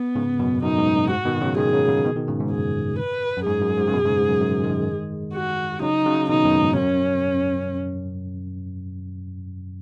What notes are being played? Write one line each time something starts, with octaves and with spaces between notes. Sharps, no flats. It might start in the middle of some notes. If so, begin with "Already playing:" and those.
Already playing: B3
G#2 C#3
F#2 B2
F#2 B2 D#4
G#2
F#2
G#2 F#4
B2 D#3
C#3 F#3
D#3 G#3 G#4
C#3 F#3
C#3 F#3
B2 D#3
B2 D#3
G#2 C#3
G#2
F#2 G#4
B4
F#2
G#2 G#4
F#2
G#2
C#3
F#2 B2
G#2 C#3
G#2
F#2
F#2
D#3 G#3
F#4
C#3 F#3 D#4
C#3 F#3
B2 D#3 D#4
F#2 B2
G#2
F#2 C#4